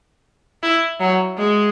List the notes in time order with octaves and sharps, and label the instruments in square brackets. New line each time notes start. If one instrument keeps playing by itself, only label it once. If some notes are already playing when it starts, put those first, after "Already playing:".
[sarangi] E4
F#3
G#3